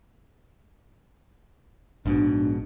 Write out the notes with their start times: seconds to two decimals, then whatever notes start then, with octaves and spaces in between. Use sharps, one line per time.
2.06 A#1 G#2 B2 D4